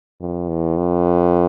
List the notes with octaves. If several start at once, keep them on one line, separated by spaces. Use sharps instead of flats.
F2
E2
F2